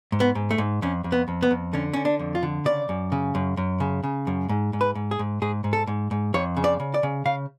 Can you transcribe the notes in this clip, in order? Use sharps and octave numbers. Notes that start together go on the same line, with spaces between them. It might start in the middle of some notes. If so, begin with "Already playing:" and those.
G#2
B3
G#2
A3
G#2
F2 C#4
F2
B3
F2
B3
F2
D3 C#4
D3 C#4
D4
F2
F4
D3
C#3 D5
F#2
C#3
F#2
F#2
C#3
C#3
F#2
G#2
G#2
B4
G#2
G#4
G#2
G#2 G#4
G#2
A4
G#2
G#2
F2 C#5
C#3
D5
C#3
D5
C#3
C#3 F5